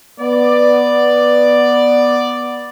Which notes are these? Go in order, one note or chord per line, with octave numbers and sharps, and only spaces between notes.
B3 D5